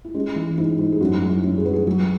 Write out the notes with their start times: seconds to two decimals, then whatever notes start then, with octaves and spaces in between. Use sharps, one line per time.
0.05 E4
0.15 G#3 C#4
0.36 E3
0.58 G#2 E4
0.79 G#2
0.92 G#4
1.01 F#2 F#4
1.22 F#3
1.29 E4
1.44 F#2
1.58 G#4
1.65 F#3 B4
1.74 G#4
1.87 F#3